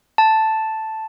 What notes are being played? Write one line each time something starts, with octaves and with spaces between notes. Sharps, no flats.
A5